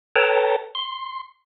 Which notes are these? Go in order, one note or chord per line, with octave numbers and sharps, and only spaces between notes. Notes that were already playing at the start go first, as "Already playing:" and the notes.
A4 B4 C#5 G5 A5 A#5
C6